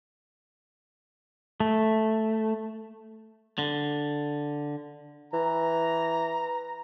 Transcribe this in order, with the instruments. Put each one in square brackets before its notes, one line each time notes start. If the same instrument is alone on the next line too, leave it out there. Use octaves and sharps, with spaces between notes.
[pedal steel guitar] A3
[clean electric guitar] D3
[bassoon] E3 [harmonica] A#5